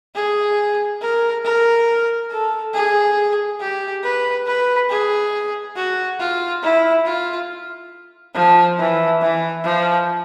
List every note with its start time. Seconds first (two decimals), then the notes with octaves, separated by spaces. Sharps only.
0.15 G#4
1.01 A#4
1.44 A#4
2.31 A4
2.74 G#4
3.60 G4
4.03 B4
4.46 B4
4.90 G#4
5.76 F#4
6.19 F4
6.63 E4
7.05 F4
8.34 F3
8.78 E3
9.21 E3
9.64 F3